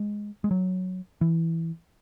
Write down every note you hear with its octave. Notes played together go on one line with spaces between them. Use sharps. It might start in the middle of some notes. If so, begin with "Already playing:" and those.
Already playing: G#3
G#3
F#3
E3